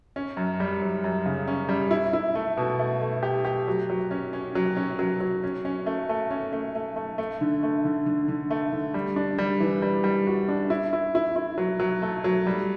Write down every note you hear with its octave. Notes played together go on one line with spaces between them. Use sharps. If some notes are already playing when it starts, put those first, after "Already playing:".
C#4
F#2
G3
F#2
F#2
C#3
C#4
G3
E4
E4
A3
B2
A3
A3
G4
G4
F#3
F#3
C#4
C#4
F#3
C#4
F#3
F#3
C#4
C#4
A3
A3
C#4
A3
A3
A3
A3
D3
A3
D3
D3
D3
A3
D3
G3
D4
G3
E3
G3
G3
F#4
D4
E4
E4
E4
E4
F#3
F#3
A3
F#3
G3